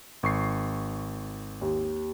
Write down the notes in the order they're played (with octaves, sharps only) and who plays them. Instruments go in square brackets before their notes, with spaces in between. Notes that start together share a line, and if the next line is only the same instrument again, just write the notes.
[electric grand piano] G#1 C#6 C7
[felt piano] D#2